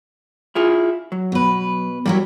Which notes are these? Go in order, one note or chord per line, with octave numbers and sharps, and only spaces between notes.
E4 F4 G#4
F#3
B2 B4
F#3 G3 E4 A#4